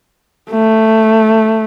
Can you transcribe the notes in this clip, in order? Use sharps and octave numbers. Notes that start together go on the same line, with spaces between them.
A3